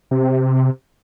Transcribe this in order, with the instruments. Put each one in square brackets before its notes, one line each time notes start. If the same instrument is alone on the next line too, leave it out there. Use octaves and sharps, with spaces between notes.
[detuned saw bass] C3